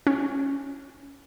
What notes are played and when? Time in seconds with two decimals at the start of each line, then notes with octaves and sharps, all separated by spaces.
0.07 C#4